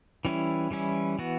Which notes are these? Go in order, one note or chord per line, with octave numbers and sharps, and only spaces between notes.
E3 G3 C#4 E4
E3 G3 C#4 E4
E3 B3 F#4